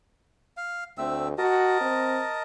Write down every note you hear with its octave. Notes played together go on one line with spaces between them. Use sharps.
F5
D2 A3 C4 E6
F#4 A#4 D#5 A5
C4